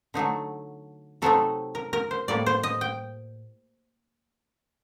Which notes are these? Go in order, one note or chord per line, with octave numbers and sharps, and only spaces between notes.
D3 F#3 A3 D#4
C3 F#3 A3 C4 D#4 A4
A#4
A#4
C5
A2 G3 A#3 D5
C5
D#5
G5